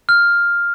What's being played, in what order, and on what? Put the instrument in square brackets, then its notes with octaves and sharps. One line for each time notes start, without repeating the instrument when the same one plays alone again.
[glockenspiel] F6